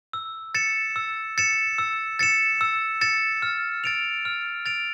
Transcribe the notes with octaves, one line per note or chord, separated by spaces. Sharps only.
E6
A6 C#7 E7
E6
A6 C#7 E7
E6
A6 C#7 E7
E6
A6 C#7 E7
F6
A6 D7 F7
F6
A6 D7 F7